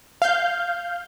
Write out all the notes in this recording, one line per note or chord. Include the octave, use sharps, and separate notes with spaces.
F5 G6